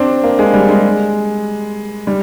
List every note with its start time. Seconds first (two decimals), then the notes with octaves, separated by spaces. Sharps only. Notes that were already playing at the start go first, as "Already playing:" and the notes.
Already playing: C4 D4
0.24 A#3
0.39 G#3
0.54 G3
0.69 G#3
2.07 G3